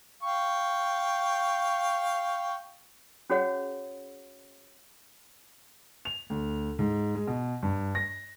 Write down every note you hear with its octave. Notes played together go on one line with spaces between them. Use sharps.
F5 G5 C#6
C#4 F#4 G#4 C#5 F#5
F7
D2
G#2
G#3
B2
G2
A#6